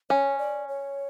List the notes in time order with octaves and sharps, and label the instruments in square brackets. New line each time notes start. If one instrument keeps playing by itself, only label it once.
[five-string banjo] C#4 [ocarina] C#5
[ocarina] D5
C#5